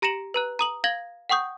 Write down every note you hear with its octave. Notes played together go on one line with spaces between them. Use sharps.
G4 A#5 A#6 C#7 E7 F#7
B4 A#5 F#6
A#5 D#6 F#7
F5 G#6 A#6 F#7 G7
F#5 G5 C#6 D#6 G6